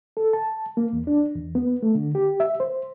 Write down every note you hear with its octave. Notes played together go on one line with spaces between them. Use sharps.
A4
A5
A#3
E2
D4
E2
B3
A3
D3
G4
E5
C5